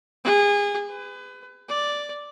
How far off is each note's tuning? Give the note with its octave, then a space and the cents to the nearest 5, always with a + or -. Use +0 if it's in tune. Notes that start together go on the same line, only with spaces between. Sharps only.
G#4 -30
B4 +30
D5 +0